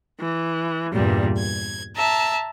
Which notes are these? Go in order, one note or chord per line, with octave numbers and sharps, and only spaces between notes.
E3
E2 G2 A#2 G3
G#6
E5 A5 A#5